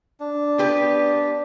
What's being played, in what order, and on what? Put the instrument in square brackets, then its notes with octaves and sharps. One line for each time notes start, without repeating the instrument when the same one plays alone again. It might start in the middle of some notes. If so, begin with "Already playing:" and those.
[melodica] D4
[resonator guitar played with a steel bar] B3 G4 B4